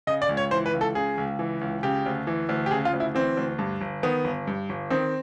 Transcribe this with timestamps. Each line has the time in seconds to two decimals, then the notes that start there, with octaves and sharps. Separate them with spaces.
0.07 C#3 D#5
0.22 D5
0.29 C#2
0.37 C#5
0.51 E3 C5
0.66 B4
0.73 C#2
0.81 A4
0.95 C#3 G#4
1.18 C#2
1.39 E3
1.61 C#2
1.83 C#3 G4
2.06 D2
2.27 E3
2.49 D2
2.66 G4
2.71 C#3 G#4
2.85 F4
2.93 D2
3.00 E4
3.15 E3 C4
3.37 D2
3.58 G2
3.81 G1
4.03 D#3 B3
4.24 G1
4.47 G2
4.69 G1
4.90 D#3 C4